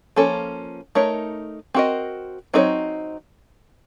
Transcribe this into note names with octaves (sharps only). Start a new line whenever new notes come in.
F3 A#3 C#4 A4
A3 D#4 A#4 C#5
C4 F#4 A#4 D#5
F#3 C4 D#4 A#4 C#5